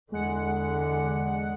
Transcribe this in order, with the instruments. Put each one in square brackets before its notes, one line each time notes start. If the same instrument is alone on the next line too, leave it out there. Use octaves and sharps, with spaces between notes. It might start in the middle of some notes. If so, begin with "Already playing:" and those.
[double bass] E2 D3 [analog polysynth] G#3 F#5 C#7